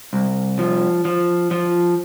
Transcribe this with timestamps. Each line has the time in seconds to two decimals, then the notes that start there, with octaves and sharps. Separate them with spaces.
0.13 C2
0.59 F3
1.05 F3
1.51 F3